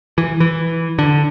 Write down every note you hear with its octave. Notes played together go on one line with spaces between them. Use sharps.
E3
E3
D3